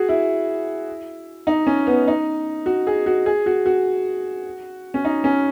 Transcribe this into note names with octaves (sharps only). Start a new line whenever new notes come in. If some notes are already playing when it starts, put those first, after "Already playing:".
Already playing: F#4 G#4
E4
D#4
C#4
B3
D#4
F#4
G#4
F#4
G#4
F#4
F#4
C#4
D#4
C#4